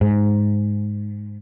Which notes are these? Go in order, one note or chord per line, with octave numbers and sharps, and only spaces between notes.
G#2